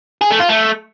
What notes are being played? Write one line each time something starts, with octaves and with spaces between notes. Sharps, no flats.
G#4
A3
F4
A3